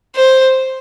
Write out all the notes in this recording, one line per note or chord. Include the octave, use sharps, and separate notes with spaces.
C5